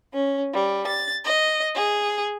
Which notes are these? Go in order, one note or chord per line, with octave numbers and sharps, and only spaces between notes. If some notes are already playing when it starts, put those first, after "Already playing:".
C#4
G3
A6
D#5
G#4